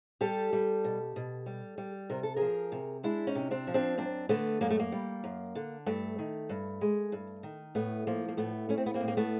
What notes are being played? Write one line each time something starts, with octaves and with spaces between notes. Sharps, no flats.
G3 G4 A4
G3
B2
B2
G3
G3
C3 A#4
A4
F3 G#4 A#4
C3
G#3 D4 E4
C#4 D#4
C3
C4 D4
F3
C4 D4
F#2 C4 D4
D3 A3 B3
F#2 A#3
A3
A#3
G3
F#2
D3
G2 A3
D#3
G2
G#3
G2
D#3
A2 A3 B3
F3 A#3
A#3
A2 A3 B3
A3 C#4
C4
B3
A#3 C4
A2
A#3
A3 B3